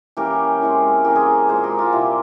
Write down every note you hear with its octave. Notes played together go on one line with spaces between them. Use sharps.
E3 A#3 C#4 G4 A#4
C#3 E3 G#3 C4
E3 A#3 C#4 G4 A#4
G#4 C5
A#2 G#3 C4 G#4 C5
G4 A#4
F4
C3 G3 A#3 E4 G4